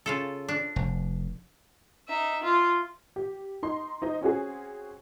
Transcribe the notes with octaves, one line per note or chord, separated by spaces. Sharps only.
C#3 F4 A4
D4
F1
D#4 E5
F4
G4
D#4 C6
D#4 C5 D#5
C4 C#4 F#4 G#4